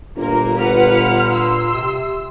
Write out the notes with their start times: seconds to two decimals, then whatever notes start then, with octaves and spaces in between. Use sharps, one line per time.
0.17 G1 A#2 A#3 A#4
0.57 B4 F#5 F6
1.33 C6 E6
1.72 C3